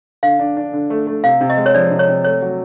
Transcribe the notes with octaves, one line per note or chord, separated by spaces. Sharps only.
D3 F5
D4
D4
D3
A3
A3
C3 F5
C3
D#5
G#3
C#5
F3 D5
C3
C#5
C3
A3 C#5
F#3